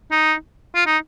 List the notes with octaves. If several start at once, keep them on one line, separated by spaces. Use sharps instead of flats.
D#4
F4
D#4